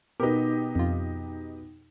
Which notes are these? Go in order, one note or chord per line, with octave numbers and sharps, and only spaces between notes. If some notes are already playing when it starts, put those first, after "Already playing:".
B2 D#4 G4 A#4 B4
F2 F4